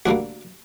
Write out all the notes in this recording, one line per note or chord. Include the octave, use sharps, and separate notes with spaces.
D2 D3 G3 A#3 D4 F#4